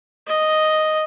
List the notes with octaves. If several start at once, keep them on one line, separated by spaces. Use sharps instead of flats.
D#5